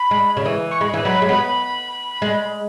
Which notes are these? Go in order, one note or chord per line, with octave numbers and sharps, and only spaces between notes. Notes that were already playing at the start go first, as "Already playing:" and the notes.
Already playing: B5
G#3
C#3
E3
C#6
G#3 B5
E3
F#3 B5
G#3
B3 B5
G#3